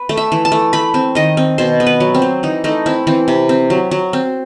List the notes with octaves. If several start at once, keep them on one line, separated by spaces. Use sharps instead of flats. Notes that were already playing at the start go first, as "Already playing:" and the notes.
Already playing: B4
A3
E5
E3
A5
A3
A3 B5
C4
D#3 D#5
C4
B2 C5
B3
B4
F#3
C4
F#3
E3 D#4
A3 D#4
C4 E4
E3 C4
C3
C4
F#3
F#3
C4